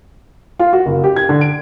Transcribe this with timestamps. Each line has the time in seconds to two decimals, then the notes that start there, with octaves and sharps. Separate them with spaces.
0.59 F4
0.73 F#4
0.86 F#1
1.04 G4
1.16 G#6
1.29 D3
1.41 D7